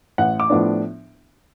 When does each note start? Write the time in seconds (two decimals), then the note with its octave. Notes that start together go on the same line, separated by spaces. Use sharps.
0.18 A1 F#5
0.40 D6
0.50 A2 F3 B3 D4